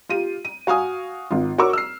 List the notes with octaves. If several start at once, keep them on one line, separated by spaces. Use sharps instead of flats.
F4 G4 D#7
D#7
F#4 F5 G#5 D#6
G#1 F4
F#4 A#4 C#5 C#6 D6 E6
E6 F6 C7